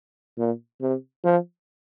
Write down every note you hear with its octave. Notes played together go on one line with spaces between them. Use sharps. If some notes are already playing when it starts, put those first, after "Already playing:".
A#2
C3
F3